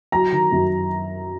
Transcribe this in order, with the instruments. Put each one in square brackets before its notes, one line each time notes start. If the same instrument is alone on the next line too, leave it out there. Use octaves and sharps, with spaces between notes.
[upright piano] F#3 A#5
D#3
F#2